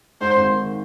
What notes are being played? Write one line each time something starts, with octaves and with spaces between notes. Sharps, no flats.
G#2 C5
G#1
D#3